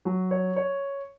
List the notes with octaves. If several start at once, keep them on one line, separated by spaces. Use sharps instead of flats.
F#3
C#5
C#5